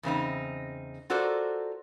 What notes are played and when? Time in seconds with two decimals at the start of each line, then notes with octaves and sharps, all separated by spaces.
0.03 E2 C#3 C4 D#4
1.10 F4 F#4 A4 A#4 C5 D5